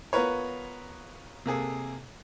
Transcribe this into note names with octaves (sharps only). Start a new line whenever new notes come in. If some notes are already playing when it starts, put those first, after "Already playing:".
B3 F4 A#4 B4 C#5
C3 A#3 G#4 A4